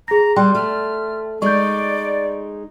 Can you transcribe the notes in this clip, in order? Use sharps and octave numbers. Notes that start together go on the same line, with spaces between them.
G#4 A#5 A#6
G3 G5 C6 F#6
A3 F6
G#3 D#4 D5 C#6 G6